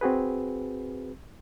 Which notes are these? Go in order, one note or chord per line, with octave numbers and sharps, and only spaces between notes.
C4 F#4 G#4 B4